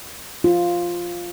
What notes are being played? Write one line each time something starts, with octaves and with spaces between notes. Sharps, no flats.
F4